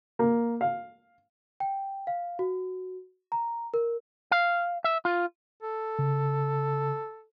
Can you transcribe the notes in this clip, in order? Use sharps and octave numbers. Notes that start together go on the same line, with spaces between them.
A#3
F5
G5
F5
F#4
A#5
A#4
F5
E5
F4
A4
C#3